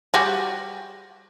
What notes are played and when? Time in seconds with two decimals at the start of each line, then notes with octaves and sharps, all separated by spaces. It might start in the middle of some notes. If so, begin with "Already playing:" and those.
0.14 G3 F#4 G#4